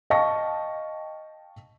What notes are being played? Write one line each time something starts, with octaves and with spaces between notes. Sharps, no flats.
D#5 F5 G5 A5 C#6 A#6